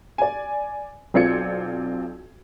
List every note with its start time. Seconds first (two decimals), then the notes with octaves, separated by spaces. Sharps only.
0.18 D5 G#5
1.14 B1 C4 F4 D5 G#6 C#7